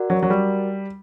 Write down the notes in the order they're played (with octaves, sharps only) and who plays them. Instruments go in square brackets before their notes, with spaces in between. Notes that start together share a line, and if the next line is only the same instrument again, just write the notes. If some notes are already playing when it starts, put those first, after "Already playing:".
Already playing: [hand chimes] F#4 A#4 D5 F#5
[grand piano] F#3
F#3
G3